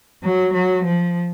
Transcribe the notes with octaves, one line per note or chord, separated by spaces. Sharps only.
F#3
F#3
F3